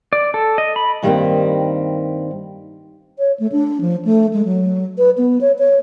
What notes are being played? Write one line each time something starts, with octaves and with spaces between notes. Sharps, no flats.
D5
A4
D#5
B5
G2 D#3 G3 A3 A#3 C4
C#5
A3
D4
F3
A3
G#3
F#3
B4
B3
C#5
C#5